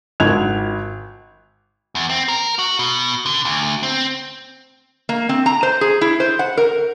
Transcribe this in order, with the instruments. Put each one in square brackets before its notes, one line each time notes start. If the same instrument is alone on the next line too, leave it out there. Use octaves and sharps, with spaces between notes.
[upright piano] G#1 F#6 G#6 F7
[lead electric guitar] E2
C4
A#4
F#4
B2
D3
D2
C4
[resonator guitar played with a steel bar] A#3
C4
A#5
C5
G#4
E4
C5
F#5
A#4